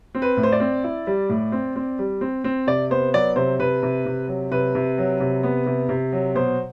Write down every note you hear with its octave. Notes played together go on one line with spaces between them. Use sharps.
C4
B4
A2
C5
D5
C4
E4
G3
A2
C4
C4
G3
C4
C4
C3 D5
B3 C5
F#3 D5
C3 C5
C3 B4
C3
C3
F#3
C3 B4
C3
F#3
C3
B3
C3
C3
F#3
B2 C5